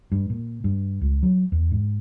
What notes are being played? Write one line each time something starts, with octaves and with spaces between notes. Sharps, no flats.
G2
A#2
G2
C#2
F#3
E2
G#2